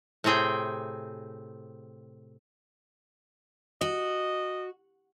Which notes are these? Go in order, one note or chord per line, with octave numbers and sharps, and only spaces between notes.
A2 C3 C4 G#4 G5
F#4 D#5